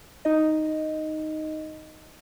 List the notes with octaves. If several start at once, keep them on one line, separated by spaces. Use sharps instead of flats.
D#4 D#5